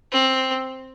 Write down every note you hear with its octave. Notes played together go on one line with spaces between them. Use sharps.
C4